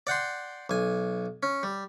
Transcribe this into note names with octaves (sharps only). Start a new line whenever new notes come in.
D5 F#5 G5 C6
B1 G#5
C#4
G3